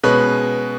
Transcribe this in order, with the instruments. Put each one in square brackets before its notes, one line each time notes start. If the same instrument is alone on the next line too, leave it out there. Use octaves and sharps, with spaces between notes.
[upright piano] B2 G#3 C#4 [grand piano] B4